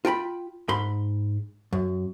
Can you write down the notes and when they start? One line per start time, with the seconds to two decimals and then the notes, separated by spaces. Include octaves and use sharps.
0.05 F4 G5 A#5 B5
0.69 G#2 B5 C6
1.73 F#2